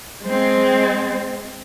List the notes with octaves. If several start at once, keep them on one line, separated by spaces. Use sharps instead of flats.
G#3 C4